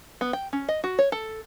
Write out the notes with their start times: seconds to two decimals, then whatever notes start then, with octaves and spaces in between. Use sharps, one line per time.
0.21 B3
0.33 G5
0.53 C#4
0.69 D#5
0.84 F#4
0.99 C#5
1.12 A4